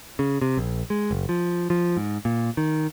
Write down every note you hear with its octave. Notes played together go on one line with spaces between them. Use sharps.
C#3
C3
A#1
G#3
F#1
F3
F3
G#2
A#2
D#3